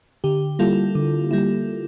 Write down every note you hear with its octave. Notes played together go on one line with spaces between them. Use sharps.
D3 G4
G3 A#3 E4 F4 A4
D3
G3 A#3 E4